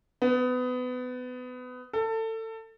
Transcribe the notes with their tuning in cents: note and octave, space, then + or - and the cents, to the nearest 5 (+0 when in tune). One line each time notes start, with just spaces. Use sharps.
B3 +25
A4 +25